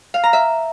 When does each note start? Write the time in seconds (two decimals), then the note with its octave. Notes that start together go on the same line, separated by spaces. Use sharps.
0.14 F5
0.23 A#5
0.33 E5